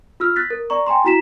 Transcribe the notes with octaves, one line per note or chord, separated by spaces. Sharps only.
F4 E6 F6
F#6 A6 B6
A#4
D5 A#5 C#6
G5 G#5 A#5 C6
E4 F#4 A#5 B6 E7